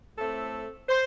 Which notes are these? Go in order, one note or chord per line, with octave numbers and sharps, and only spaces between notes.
A2 A3 C4 A4
C5